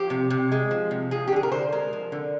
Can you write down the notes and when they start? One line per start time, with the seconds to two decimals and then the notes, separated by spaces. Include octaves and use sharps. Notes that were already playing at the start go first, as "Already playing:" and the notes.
Already playing: F3 G4
0.10 C3
0.30 C3
0.52 G#3
0.71 F3
0.91 C3
1.11 F3 G#4
1.28 G4
1.32 D3 G#4
1.43 A#4
1.51 D3 C5
1.72 G#3 A#4
1.93 F3
2.12 D3